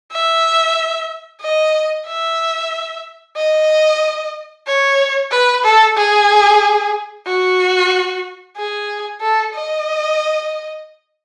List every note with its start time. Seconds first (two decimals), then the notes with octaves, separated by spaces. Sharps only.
0.12 E5
1.41 D#5
2.07 E5
3.36 D#5
4.66 C#5
5.31 B4
5.64 A4
5.97 G#4
7.26 F#4
8.57 G#4
9.21 A4
9.54 D#5